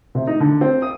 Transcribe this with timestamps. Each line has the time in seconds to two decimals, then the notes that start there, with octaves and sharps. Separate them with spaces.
0.15 C3
0.27 D#4
0.40 D3
0.61 C4
0.82 D#6